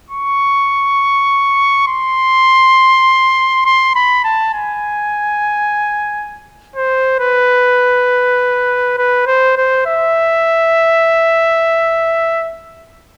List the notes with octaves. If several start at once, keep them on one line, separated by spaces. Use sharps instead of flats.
C#6
C6
C6
B5
A5
G#5
C5
B4
B4
C5
C5
E5